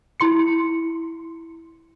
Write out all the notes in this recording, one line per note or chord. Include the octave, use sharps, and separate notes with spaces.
E4 C6 C#7